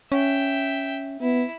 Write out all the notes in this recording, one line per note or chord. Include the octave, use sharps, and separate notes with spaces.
C#4 E5 G5
B3 E4